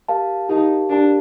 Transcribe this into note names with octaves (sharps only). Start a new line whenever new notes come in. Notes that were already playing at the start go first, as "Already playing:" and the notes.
G4 A#4 F5 A5
D#4 G4 A#4 F5 A5
D4 G4 A#4 F5 A5